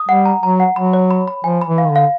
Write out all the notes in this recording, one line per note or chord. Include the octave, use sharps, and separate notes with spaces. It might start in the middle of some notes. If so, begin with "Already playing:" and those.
Already playing: D#6
G3 F#5
A#5
F#3 A#5
F#5
F#3 B5
C#5
B5
B5
F3 G#5
B5
E3
F5
D#3
D3
F5